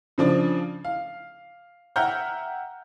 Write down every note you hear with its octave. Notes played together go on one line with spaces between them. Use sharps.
C#3 F3 D4
F5
E5 F#5 G5 A#5 F6 G6